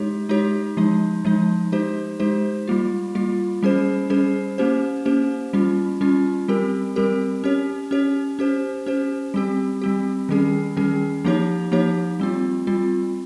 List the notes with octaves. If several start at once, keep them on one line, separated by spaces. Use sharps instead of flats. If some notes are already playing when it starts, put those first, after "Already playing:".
Already playing: G#3 D#4 G4 C#5
G#3 D#4 G4 C#5
F3 G#3 D#4
F3 G#3 D#4
G#3 D#4 G4 C5
G#3 D#4 G4 C5
G3 A#3 F4
G3 A#3 F4
G3 C#4 G#4 C5
G3 C#4 G#4 C5
A#3 C#4 G4 C5
A#3 C#4 G4 C5
G3 C#4 F4
G3 C#4 F4
G3 C4 G4 A#4
G3 C4 G4 A#4
C#4 G4 C#5
C#4 G4 C#5
C#4 G4 C5
C#4 G4 C5
G3 C4 G4
G3 C4 G4
D#3 G3 C#4 G#4
D#3 G3 C#4 G#4
F3 A#3 D#4 G4 C#5
F3 A#3 D#4 G4 C#5
G3 C4 F4
G3 C4 F4